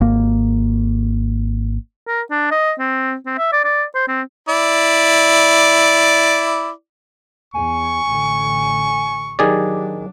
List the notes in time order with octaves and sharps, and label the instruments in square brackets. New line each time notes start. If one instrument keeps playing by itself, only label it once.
[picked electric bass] G#1 A#3
[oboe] A#4
D4
D#5
C4
C4
E5
D5
D5
C5
C4
[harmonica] E4 D5
[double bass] E2 [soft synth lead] G#5 [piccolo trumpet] C#6
[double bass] A1 D3
[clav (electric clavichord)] D#3 G#4 D5 [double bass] F#3 D4 [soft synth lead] G4